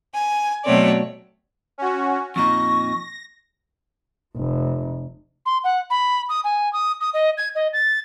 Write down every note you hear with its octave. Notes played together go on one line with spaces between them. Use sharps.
G#5
B2 F#3 A3 C4 C#5 D5
C#4 F#4
F2 A#2 D#4 C#6 A#6
F1
C6
F#5
B5
D#6
G#5
D#6
D#6
D#5
G#6
D#5
A6